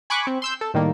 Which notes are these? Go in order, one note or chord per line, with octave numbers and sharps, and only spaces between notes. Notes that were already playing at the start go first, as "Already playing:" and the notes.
G#5 B5 C#6 D6 F#6
C4
C6 E6 G6
A4
A2 D#3 G3 A#3